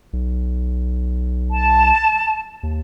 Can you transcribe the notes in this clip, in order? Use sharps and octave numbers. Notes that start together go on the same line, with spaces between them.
B1
A5
D#2